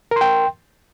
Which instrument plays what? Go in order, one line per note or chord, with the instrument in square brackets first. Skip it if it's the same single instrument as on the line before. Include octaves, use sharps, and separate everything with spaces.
[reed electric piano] A#4
C6
G5